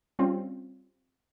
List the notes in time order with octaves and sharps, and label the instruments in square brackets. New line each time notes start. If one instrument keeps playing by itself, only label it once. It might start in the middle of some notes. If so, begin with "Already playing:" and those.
[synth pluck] G3 C4 C#4 F4